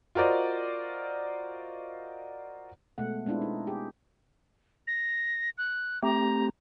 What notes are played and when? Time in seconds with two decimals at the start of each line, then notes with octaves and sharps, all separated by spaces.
0.15 F4 F#4 A#4 C5 D5 D#5
2.98 B2 G#3 A3 F#5
3.26 G#3 B3 C4 D4 E4 F4
3.42 D#4
3.67 G4 G#4
4.87 A#6
5.58 F#6
6.03 A3 C4 G4 A#5